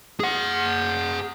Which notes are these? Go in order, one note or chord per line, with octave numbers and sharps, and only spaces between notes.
G#4 F#5